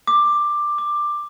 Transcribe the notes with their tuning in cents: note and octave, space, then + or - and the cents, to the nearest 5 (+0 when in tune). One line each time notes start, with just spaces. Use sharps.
D6 +10
D6 +15